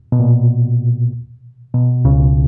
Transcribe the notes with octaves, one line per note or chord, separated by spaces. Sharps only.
B2
A#2
B2
C#2 C#3